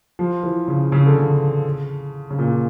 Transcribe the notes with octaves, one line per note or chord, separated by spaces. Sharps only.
F3
E3
C#3
C#3
D3
C#3
C#3
A#2